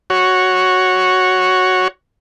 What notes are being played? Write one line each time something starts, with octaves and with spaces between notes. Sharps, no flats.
F#4 C#5